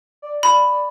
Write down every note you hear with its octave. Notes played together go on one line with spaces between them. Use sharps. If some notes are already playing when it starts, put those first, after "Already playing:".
D5
B5